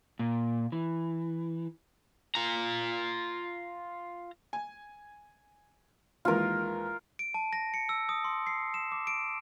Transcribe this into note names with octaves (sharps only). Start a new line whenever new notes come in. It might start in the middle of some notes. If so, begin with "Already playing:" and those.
A#2
E3
F4 A#5
G#5
D#2 E3 G#3 F4 A#4
D7
A5
A#6
C#7
E6
D#6
C6
C7
E7
D6
D7